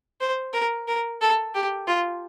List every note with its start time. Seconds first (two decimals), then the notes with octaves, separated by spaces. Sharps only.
0.21 C5
0.53 A#4
0.87 A#4
1.21 A4
1.55 G4
1.87 F4